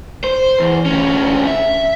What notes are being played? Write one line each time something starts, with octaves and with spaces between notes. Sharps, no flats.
C5
E2
D2 C#4
E5